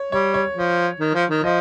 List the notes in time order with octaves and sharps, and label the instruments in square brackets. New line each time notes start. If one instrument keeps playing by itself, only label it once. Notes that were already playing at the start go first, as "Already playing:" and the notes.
Already playing: [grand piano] C#5
[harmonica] G3 [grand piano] C#5
[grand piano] C#5
[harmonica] F3
D#3
F3
D#3
[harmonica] F3 [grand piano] D#5